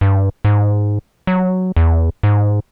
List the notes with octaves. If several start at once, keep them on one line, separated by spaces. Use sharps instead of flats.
G2
G#2
F#3
E2
G#2